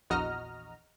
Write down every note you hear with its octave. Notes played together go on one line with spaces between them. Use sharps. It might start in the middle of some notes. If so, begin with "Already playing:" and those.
A#1 E2 F#4 D#5 A#5 F6